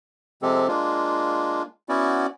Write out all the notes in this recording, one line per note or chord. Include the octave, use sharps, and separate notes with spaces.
C3 F3 G#3 C4 G4 A4
G#3 A#3 D4 F4
B3 C#4 E4 F#4 D5